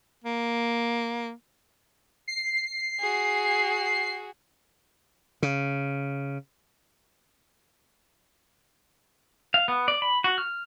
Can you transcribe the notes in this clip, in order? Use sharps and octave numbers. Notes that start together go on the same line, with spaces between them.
A#3
C7
F#4 G#4
C#3
F5
B3
D5
B5
F#4
F6